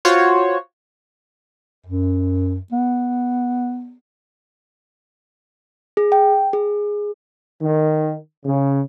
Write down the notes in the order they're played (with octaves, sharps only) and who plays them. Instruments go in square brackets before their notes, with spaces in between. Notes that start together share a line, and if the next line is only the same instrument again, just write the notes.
[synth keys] F4 F#4 C5 C#5
[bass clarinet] F#2
B3
[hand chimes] G#4
G5
G#4
[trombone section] D#3
C#3